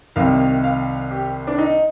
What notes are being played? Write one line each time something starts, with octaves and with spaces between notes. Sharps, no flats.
C2 C3 D#3 F5
F5
G4
D4
D#4